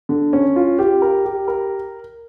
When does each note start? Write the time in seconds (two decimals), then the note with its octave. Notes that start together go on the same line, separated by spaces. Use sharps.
0.09 D3
0.33 C#4
0.56 F4
0.79 G4
1.02 A#4
1.25 G4
1.48 A#4